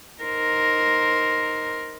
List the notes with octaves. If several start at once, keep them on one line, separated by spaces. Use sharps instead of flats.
D#4 A#4 C5